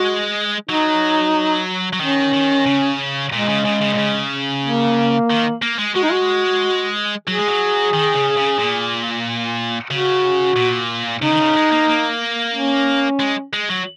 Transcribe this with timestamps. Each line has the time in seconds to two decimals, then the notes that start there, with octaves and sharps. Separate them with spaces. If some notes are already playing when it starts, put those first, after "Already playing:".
Already playing: G#3 F#4
0.69 F#3 D#4
1.93 F#3
2.01 D#3 C#4
2.34 D#3
2.67 C#3
3.32 A#2 G#3
3.49 C#3
3.65 C#3
3.82 C#3
3.94 A#2
3.98 C#3
4.63 A#3
5.30 D#3
5.62 A#3
5.79 G#3
5.95 G#3 F#4
6.03 D#4
6.12 F#4
7.27 F#3 G#4
7.38 G#3
7.47 F#3
7.93 D#3
8.15 C#3
8.37 C#3
8.59 A#2
9.91 C#3 F#4
10.56 A#2
11.22 C#3 D#4
11.31 D#3
11.39 C#3
11.55 G#3
11.71 A#3
11.88 A#3
12.54 C#4
13.20 G#3
13.53 G#3
13.69 F#3